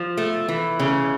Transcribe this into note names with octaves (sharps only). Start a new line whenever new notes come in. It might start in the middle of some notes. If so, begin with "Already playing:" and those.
Already playing: F3
A3
E3
C#3